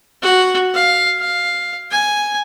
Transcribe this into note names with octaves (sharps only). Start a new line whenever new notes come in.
F#4
F5
F5
G#5